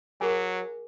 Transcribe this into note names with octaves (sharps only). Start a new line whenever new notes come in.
F#3 G#4 A#4 G#5